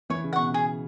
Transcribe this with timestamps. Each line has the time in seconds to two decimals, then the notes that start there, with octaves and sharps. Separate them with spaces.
0.10 E3 C#5
0.24 C#3
0.33 B2 F#5 C#6
0.49 C#3
0.54 G#4